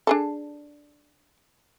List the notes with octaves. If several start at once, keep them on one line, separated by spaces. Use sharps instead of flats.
D4 G#4 A4